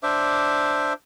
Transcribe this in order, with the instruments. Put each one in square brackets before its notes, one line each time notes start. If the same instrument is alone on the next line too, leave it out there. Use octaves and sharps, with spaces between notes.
[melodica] D4 C5 E5 D6